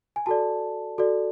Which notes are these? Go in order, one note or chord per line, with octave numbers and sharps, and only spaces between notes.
G#5
F#4 A4 D5 A5
F#4 A4 D5